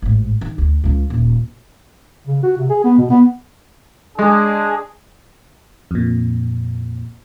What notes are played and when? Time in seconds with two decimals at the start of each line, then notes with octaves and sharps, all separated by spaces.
0.02 A1 G#2
0.41 D#3
0.58 D2
0.84 C#2 C#3
1.10 D#1
2.27 C#3
2.43 F#4
2.57 C3
2.70 G#4
2.84 B3
2.98 B2
3.10 B3
4.19 G#3 D4 G#4
5.91 F2 A#2